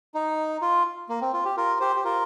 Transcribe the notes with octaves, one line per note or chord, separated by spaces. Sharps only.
D#4
F4
A#3
C4
F4
G4
F4 A#4
G4 C5
G4
F4 A#4